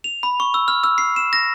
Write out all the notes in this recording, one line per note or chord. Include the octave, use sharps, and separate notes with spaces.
F7
B5
C#6
E6
F6
E6
C7
E7
A#6